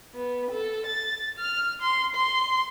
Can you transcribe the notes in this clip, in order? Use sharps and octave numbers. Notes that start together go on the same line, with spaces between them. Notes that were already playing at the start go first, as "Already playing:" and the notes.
B3
A4
A6
F6
C6
C6